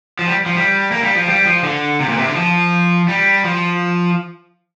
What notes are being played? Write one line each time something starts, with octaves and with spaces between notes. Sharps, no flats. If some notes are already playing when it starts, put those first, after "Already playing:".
F3
G3
F3
G3
A#3
G3
F3
G3
F3
D3
C3
A#2
C3
D3
F3
G3
F3